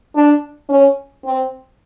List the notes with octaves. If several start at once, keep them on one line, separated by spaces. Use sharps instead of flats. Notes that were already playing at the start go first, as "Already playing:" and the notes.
D4
C#4
C4